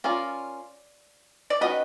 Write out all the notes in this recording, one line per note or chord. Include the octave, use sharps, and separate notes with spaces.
C#4 F4 A#4 D5
D5
D#3 G#3 C#4 F#4 B4 D#5